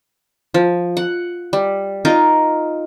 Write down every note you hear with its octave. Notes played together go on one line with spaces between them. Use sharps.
F3
F#5
G3
D#4 F4 A#4 D#5